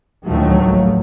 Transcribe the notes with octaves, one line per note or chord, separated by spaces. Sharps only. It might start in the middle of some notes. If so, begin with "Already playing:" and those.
D2 A2 D#3 F3 F#3 A3
A1